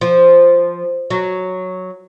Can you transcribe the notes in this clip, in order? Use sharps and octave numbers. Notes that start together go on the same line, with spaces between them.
F3
F#3